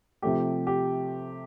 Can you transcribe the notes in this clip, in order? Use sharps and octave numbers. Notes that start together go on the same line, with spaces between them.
C3 F3 A3 G4
G4